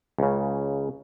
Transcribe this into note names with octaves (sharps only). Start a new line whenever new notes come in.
C#2 C#3